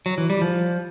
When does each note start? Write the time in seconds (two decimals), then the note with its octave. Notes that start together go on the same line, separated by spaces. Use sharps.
0.06 F#3
0.18 E3
0.30 G3
0.42 F3